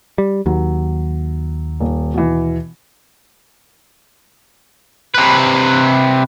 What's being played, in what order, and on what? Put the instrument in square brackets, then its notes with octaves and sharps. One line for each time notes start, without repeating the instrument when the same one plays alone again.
[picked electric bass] G3
[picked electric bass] D#2 [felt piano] F#3
[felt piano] D#1
B2 E3
[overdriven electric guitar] C3 B4